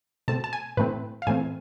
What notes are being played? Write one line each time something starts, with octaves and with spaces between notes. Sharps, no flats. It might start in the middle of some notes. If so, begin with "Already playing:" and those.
B2 A3 C4 A5
A5
G#5
A2 E3 A3 C4 B4
F5
A2 E3 A3 C4 G#5